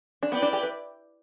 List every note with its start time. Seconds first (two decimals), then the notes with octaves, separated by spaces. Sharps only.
0.23 D4
0.31 B3 E4 B4 D5 G5
0.42 D4
0.53 G4
0.63 B4